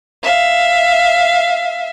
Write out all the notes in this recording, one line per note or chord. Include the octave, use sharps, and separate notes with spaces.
E5 F5